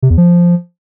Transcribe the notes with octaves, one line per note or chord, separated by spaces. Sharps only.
C3
E2
F3